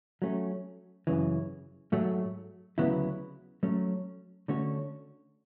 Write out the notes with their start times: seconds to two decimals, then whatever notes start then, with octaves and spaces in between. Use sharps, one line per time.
0.22 F#3 A3 C#4
1.07 F#2 C#3 E3
1.92 G#2 F#3 A3
2.78 D2 C#3 F#3 B3 E4
3.63 F#3 A3 C#4
4.48 D3 A3 C#4 F#4 C#5